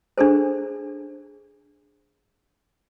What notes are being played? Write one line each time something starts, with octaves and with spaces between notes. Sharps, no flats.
D4 G#4 A4 C5